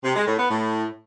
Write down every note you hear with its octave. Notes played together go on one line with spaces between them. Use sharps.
C3
G#3
A2
B3
A2